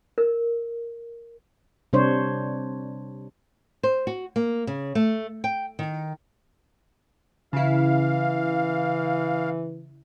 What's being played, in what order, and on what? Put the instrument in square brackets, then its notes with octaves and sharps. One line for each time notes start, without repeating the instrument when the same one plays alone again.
[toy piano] A#4
[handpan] C3 G3 D4 C5 C#5
[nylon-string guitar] C5
F#4
A#3
C#3
A3
G5
D#3
[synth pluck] C#3 E4 [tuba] E3 [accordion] F5